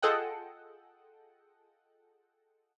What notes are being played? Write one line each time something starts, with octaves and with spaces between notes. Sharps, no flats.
F4 G#4 A4 D#5 F#5 G5